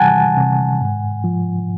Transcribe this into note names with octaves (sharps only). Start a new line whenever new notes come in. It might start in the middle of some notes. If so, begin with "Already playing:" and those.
Already playing: C3 E3 G3 F#5 G#5 A5
C3
G#2
F3